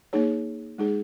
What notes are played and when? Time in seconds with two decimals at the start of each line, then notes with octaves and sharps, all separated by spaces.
0.13 A#3 D#4 G#4 C#5
0.78 G#3 D#4 G#4